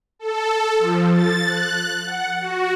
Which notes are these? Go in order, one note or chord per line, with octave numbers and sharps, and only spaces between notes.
A4
F3
A6
F#6
F#5
F#4